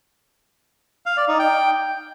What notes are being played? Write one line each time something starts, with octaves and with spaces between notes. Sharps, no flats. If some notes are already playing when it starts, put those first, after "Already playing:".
F5
D5
D#4
G5